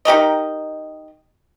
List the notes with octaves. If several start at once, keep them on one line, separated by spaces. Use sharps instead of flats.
D#4 G4 A#4 D#5